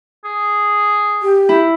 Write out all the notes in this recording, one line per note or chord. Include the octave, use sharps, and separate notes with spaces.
G#4
G4
E4